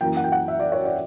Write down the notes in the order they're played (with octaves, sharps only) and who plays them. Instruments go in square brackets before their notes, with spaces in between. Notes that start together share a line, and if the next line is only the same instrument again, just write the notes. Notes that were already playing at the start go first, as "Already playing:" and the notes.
[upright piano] F#2 E3 A#3 G5
F#5
G5
F#5
E5
D5
C#5
D5